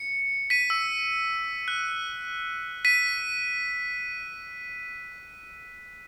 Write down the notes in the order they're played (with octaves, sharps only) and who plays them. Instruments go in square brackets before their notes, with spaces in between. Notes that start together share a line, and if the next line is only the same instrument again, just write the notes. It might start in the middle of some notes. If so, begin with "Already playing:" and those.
Already playing: [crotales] C#7
B6 D#7
E6
F#6
B6 D#7